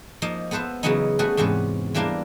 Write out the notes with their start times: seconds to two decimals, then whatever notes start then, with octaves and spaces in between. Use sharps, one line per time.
0.22 F3 A#3 D#4
0.51 B3 A4 B4 C5 E5
0.83 C#3 E3 F#3 B3 C#4 D#4
1.19 G3 A3 F#4 G#4 B4
1.37 E2 G#2 C3 C#4 B4
1.94 E3 G3 A#3 D4 E4 A#4